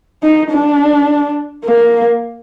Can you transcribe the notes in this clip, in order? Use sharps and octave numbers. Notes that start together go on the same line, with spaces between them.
D#4
D4
A#3